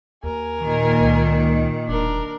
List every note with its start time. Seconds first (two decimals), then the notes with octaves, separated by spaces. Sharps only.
0.24 D#2 A#4 G#5
0.63 A#2 D#3
1.00 C#2
1.88 E1 D4 A#4